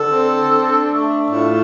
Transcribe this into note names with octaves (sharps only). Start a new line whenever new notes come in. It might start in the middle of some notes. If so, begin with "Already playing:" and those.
Already playing: D3 A4
C4
D4
A3
A2 F4